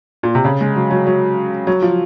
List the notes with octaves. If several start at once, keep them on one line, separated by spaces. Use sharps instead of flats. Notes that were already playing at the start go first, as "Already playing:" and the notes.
A#2
C3
C#3
G#3
F#3
F#3
F#3
F#3
F3